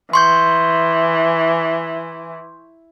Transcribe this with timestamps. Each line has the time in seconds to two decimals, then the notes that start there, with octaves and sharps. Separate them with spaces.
0.13 E3 C6 C#6 G6